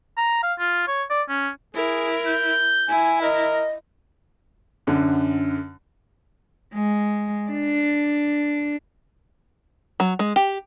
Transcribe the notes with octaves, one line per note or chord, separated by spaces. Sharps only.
A#5
F5
F4
C#5
D5
C#4
E4 G#4 A#4
G6
E4 G#5
A#4 D#5
F#2 D3
G#3
D4
F#3
G#3
G4